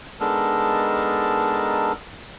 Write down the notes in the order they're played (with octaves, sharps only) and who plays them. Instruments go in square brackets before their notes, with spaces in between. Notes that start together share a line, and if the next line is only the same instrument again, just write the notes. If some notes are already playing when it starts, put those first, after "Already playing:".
[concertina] G#3 B3 D4 D#4 A4 A#4